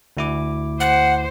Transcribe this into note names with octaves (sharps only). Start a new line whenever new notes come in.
D2 E4 D6
C5 F#5